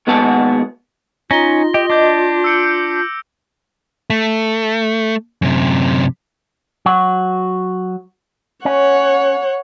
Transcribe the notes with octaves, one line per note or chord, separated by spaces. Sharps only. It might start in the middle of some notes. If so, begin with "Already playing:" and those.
D#2 G#3 B3 F#4 G#4 A5
C#4 D#4 F4 A#6 G7
G4 D#5
D4 D6 G6
E6 G6 C#7 D7
A3
F#2 C3
F#3 F#4
C#4 C#5 F#5